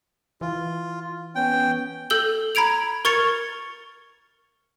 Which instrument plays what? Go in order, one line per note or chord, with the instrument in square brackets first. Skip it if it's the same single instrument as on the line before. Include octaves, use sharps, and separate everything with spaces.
[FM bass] E3 [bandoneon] F4
[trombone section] B3 C#4 [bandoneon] G5
[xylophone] A4 E6 G6 F#7 G7
A#5 B5 G#6 D7 F7
A#4 C#6 G#6 A6 C#7 F7